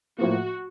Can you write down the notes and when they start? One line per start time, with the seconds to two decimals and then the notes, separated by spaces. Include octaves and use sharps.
0.18 A2 F3 A#3 F#4